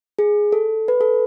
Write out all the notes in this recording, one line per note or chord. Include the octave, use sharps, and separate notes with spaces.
G#4
A4
B4
A4